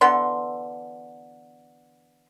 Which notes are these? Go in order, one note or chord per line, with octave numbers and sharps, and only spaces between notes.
D3 E3 B3 C6